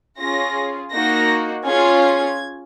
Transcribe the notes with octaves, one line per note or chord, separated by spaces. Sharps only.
C#4 F4 G#4 A#6
A#3 D#4 F#4 A#6
C#4 F4 G#4 G#6
G#6